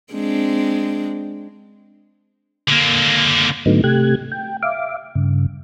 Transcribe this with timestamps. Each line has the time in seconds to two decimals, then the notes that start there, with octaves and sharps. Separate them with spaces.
0.13 G#3 C4 D4
2.69 D3 A#3
3.66 G#2 D3 F#3 A3 B3 D#4
3.84 C3 A3 G4 F#6 G#6
4.32 G5
4.63 E5 F5 D6
5.15 G2 C#3